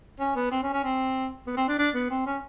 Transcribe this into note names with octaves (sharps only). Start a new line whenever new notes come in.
C#4
B3
C4
C#4
C#4
C4
B3
C4
D4
D4
B3
C4
C#4